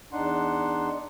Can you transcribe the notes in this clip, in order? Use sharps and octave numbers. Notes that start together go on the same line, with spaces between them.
E2 D4 D#4 F#5 C6